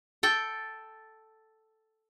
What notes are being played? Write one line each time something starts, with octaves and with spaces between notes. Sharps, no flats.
A4 G5